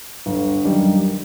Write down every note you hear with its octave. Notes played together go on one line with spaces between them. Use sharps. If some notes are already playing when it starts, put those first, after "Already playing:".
G1
F#2 D#3 G3 D4